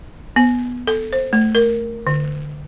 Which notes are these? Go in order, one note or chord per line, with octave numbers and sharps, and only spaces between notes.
B3
A4
C5
A3
A#4
D3